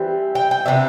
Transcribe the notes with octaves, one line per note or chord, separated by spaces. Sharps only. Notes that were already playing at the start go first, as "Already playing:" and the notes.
Already playing: E3 G3 C4
G5
G5
C3 G3 B3 D4 E5